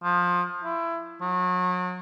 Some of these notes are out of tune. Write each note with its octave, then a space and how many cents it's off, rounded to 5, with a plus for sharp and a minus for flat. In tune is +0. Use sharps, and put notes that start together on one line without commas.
F3 +20
E4 +25
F#3 -35